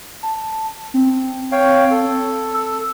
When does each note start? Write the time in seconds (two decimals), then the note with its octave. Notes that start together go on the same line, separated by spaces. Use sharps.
0.23 A5
0.94 C4
1.52 C#5 F5 G5
1.91 A4
2.54 E6